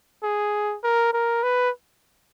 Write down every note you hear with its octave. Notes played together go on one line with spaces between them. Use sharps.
G#4
A#4
A#4
B4